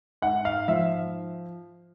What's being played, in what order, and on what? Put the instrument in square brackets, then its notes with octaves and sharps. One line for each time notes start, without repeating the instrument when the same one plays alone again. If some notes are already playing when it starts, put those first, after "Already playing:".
[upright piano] G#2 F#5
F5
F3 E5